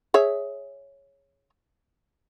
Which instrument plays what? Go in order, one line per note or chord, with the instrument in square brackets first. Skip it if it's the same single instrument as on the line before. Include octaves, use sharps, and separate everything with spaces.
[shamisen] G#4 C#5 E5